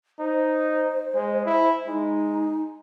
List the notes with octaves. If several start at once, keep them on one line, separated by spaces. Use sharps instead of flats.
D#4 C5
G#3
E4
G#3 D#4